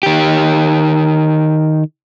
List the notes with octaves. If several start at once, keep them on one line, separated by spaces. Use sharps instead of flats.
D#3 G4